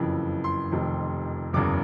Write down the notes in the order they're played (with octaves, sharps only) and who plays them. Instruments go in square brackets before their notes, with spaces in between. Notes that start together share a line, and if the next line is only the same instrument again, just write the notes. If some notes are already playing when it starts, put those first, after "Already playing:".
Already playing: [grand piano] F#1 F2 C#3 E3
C6
F1 F2 C3 D#3
F#1 E2 C#3 D6